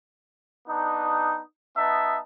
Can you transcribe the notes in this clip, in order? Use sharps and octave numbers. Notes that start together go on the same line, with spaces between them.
B3 D4 D#4
B3 D#4 E5 A5